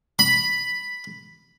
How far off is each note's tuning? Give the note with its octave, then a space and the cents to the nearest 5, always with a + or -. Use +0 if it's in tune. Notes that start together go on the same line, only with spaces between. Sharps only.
B5 +0